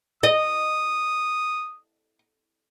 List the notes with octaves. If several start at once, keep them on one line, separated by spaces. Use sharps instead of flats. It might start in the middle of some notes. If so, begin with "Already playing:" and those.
D#5 D#6